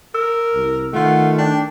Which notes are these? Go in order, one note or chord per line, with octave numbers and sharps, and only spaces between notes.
A#4 E6
C2
D#3 A3 F4 F#5
D4 G5